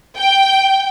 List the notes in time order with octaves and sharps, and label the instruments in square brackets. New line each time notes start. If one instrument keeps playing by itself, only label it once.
[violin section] G5